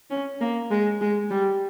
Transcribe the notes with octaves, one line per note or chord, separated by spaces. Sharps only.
C#4
A#3
G#3
G#3
G3